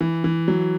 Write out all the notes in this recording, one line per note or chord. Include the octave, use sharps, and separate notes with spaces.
E3
E3
F#3